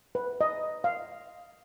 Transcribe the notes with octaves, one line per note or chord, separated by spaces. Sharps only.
B4
D#5
F5